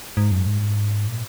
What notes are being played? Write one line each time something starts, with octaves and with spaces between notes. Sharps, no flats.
G#2
F#2
G#2
A#2